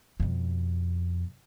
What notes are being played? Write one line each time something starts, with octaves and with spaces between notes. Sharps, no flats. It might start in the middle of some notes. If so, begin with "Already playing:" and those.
F2 B2